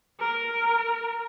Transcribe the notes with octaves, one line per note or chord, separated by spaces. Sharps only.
A#4